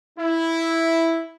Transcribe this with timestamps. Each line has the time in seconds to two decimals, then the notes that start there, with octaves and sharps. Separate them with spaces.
0.18 E4